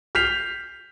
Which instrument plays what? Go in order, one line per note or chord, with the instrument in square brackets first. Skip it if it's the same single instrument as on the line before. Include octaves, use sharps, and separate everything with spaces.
[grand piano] F6 G6 B6 C7 F7